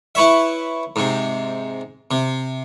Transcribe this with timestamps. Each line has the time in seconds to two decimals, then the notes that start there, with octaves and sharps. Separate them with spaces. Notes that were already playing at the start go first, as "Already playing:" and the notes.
0.15 E4 B4 C#5 E5
0.96 G#2 C3
2.11 C3